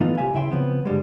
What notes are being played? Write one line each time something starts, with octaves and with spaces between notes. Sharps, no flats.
E3 A3 B3 D#4 F4
C2 G4 E5 F5 G#5
D#2 C#3 E4 E5 G5 C6
C#3 F3 B3 C4
G2 D3 G3 G#3